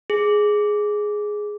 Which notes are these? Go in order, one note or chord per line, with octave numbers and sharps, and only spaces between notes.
G#4